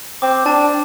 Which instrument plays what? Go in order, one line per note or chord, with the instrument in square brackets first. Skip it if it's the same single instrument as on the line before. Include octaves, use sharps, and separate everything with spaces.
[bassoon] C4 [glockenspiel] D6
[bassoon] D4 [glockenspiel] A5